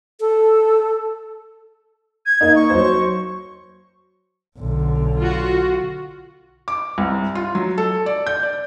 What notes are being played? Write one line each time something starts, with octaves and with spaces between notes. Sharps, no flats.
A4
G#6
A#3 D#4
C#6
F#3 C5
B1 D3
F4 F#4
D6
C2
F4
F#3
A4
D5
G6
D5